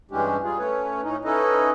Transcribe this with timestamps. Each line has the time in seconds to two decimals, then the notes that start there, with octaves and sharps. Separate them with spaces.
0.11 G2 E3 G#3 C#4 D4 G4
0.43 G3 F4 G#4
0.58 A3 C#4 B4 C#5
1.03 A2 C#4 D#4
1.25 C#4 D#4 E4 A4 B4 D#5